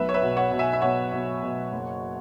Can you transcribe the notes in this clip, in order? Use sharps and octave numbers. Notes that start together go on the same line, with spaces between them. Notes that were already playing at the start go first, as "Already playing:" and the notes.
Already playing: B1 B4 E5
C#5
B4 E5
B2
C#5 F#5
B2
E5 G#5
E5
B2 C#5 F#5
B2
B2
F#1